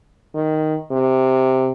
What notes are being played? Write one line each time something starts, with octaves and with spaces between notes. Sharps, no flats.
D#3
C3